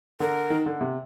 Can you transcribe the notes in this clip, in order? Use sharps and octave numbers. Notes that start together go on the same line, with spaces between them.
D3 A#4
D#3
D3
C3